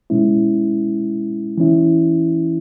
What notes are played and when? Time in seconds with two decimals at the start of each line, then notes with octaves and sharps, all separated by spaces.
0.10 B2 G#3 C#4 E4
1.58 E3 C#4 E4